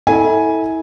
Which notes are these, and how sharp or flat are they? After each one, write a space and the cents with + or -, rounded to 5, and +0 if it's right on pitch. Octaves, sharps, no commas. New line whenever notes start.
E4 -30 A4 +0 G#5 +0